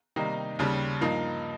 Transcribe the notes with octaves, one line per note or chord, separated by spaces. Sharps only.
C3 D#3 G3 A#3 D#4
D#2 C#3 G3
G2 F3 A#3 D#4